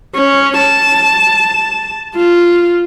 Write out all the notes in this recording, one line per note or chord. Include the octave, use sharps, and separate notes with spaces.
C#4
A5
F4